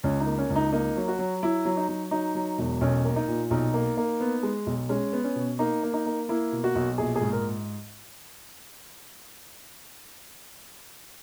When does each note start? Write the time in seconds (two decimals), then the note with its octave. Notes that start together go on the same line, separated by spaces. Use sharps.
0.03 C#2 C#4
0.20 D#4
0.26 A#3
0.38 C#4
0.50 C#2
0.56 D#4
0.72 A#3 D#4
0.97 F#3
1.08 F#4
1.19 F#3
1.43 F#3 E4
1.65 F#3
1.77 D#4
1.89 F#3
2.11 F#3 D#4
2.35 F#3
2.59 E1
2.81 B1 C#4
3.05 A#3
3.16 D#4
3.28 A#2
3.50 B1 D#4
3.74 A#3
3.97 A#3
4.20 B3
4.43 G#3
4.66 B1
4.89 G#3 C#4
5.13 B3
5.24 C#4
5.36 B2
5.59 A#3 D#4
5.83 A#3
5.93 D#4
6.06 A#3
6.29 A#3 E4
6.52 B2
6.64 F#4
6.75 B1
6.98 A#1 G#4
7.16 G#4
7.21 G#2
7.33 A#4